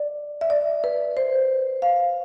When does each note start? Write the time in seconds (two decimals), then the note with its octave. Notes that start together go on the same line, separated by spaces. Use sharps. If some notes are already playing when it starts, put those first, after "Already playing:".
Already playing: D5
0.41 E5
0.50 D5
0.84 B4
1.17 C5
1.82 F5